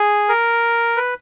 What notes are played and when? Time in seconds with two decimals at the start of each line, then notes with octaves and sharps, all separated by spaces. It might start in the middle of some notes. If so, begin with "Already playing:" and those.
Already playing: G#4
0.29 A#4
0.97 B4